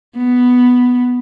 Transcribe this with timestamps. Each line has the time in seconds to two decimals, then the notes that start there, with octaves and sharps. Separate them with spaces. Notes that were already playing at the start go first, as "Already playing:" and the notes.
0.17 B3